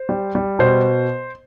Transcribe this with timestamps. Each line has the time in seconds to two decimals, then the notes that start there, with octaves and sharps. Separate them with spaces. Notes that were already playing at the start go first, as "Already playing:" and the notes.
Already playing: C5
0.09 G3
0.35 G3
0.59 B2 C5